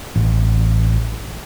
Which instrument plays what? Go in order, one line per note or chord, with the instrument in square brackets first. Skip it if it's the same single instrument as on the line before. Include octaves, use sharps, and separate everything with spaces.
[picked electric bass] A1